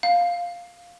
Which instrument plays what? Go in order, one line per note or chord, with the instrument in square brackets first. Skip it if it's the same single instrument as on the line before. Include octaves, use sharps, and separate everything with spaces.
[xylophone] F5